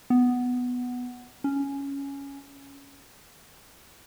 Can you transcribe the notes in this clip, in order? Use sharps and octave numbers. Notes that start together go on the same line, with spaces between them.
B3
C#4